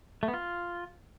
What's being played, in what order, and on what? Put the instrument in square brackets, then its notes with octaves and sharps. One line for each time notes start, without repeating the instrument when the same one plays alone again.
[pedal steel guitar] A3
B3
F4